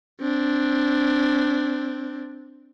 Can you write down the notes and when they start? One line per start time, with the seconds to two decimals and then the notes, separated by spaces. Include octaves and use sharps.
0.21 C4 D4